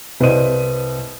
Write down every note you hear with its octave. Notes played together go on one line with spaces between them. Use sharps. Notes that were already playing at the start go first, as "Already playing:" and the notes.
C2 B4 C5 D5 D#5 D#7